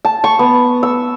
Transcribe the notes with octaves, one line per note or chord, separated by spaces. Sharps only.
A5
C#6
B3
E6